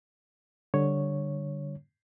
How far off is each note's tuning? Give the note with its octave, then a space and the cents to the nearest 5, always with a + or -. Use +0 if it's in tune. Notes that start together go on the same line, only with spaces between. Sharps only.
D3 +0 G3 +0 C#5 +0